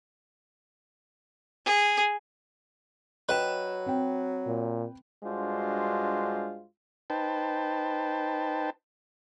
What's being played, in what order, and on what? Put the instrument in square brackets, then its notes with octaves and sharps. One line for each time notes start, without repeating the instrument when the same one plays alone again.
[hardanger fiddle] G#4
[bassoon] F#3 [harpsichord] B4 [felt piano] D#5 G5 E7
[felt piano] C4 G5
[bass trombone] A#2
[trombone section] G2 G#3 D4 F4 F#4 C5
[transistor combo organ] D#4 B4 C5 G5 A5